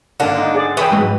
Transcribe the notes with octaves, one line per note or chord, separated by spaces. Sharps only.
G#1 D3 A#3 D4 F#5
D#4
G#4 D5
E3 G#4 B4 C#5 G5 B5 D#6
G#2 F#3 G#3